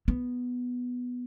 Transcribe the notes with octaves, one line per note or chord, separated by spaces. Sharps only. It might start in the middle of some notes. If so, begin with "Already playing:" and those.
B3